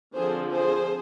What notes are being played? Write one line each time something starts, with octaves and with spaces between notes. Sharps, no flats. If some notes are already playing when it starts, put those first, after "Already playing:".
D3 F3 C4 G#4 C5
G#4 C5